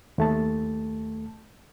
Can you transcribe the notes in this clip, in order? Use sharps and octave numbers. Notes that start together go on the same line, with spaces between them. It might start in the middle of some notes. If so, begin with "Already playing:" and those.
D#2 A3 A5